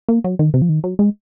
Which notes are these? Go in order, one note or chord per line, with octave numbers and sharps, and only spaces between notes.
A#3
F#3
D#3
C3
F3
D#3
F#3
G#3